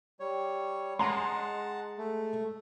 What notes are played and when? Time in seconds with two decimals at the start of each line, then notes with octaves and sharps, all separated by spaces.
0.20 G3 C#5
0.99 G#3 F#5 A5 A#5 C6
1.98 A3